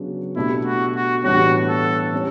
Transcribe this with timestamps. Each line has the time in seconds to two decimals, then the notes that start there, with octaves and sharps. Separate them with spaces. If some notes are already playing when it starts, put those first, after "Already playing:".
Already playing: C#3 F#3 B3 D4 F#4
0.36 B2 A3 D4 E4 G4
0.65 F#4
0.96 F#4
1.24 A2 E3 G3 B3 D4 F#4
1.68 A4
2.13 G3 C#4